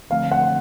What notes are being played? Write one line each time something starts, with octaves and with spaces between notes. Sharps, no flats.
D3 F3 A3 C4 F5
F#5